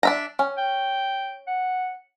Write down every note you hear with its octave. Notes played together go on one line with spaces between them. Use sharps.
D4 E5 A#5
C#4
G5
F#5